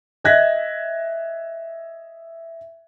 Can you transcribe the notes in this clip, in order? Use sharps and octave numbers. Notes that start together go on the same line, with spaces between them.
D#5 E5 F#6 G#6 A#6 B6